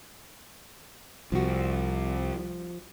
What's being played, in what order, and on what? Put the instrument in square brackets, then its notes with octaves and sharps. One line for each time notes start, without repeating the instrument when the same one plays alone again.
[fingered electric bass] C2 [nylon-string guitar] F3 F#4